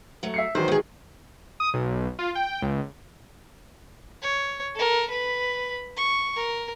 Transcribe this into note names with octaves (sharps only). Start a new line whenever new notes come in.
F#3 A3
E5 C7 C#7
D#3 E3 F#3 C5
B3 G#4
D#6
B1
F4
G5
C#2
C#5
A4 A#4
B4 B5
C#6
A#4